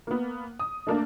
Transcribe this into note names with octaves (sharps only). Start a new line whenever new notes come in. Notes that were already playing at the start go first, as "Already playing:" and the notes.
A#3 B3
D#6
A3 A#3 D4